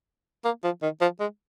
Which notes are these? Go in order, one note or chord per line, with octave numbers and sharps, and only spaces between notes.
A#3
F3
D#3
F3
G#3